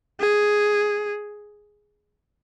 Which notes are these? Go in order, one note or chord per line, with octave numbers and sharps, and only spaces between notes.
G#4